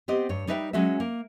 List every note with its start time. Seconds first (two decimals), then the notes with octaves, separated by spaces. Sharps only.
0.08 B3 C4 G4 D#5
0.29 G2 C#5
0.47 G3 D#4 B4 E5 F5 G5
0.73 F#3 G#3 C#4 F#4 E5
1.00 A#3